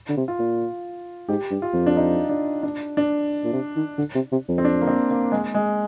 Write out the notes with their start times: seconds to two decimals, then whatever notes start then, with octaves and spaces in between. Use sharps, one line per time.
0.09 D3
0.17 C3
0.28 F4
0.39 A#2
1.29 G#2 G4
1.51 G2
1.62 F4
1.73 F2
1.87 D4
1.97 D#4
2.29 D4
2.63 D4
2.97 D4
3.44 A#2
3.53 C3
3.76 D#3
3.98 D3
4.15 C3
4.32 C3
4.49 F2
4.58 C4
4.65 D4
4.81 A#3
4.87 C4
5.11 A#3
5.32 G#3
5.54 G#3